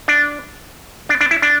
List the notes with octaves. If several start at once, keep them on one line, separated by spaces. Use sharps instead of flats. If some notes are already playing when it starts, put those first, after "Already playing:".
D4
D4
D4
E4
D4